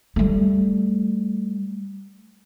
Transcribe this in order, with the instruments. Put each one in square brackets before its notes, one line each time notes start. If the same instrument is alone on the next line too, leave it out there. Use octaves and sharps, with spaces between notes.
[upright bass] G3 A3